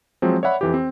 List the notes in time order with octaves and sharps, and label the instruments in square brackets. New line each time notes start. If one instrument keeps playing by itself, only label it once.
[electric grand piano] F3 F#3 G#3 C4
C#5 D5 E5 F#5 B5
F2 E3 G4
C4